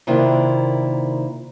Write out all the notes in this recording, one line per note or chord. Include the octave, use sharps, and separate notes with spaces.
C3 D#3 A#3 D4 E4 F4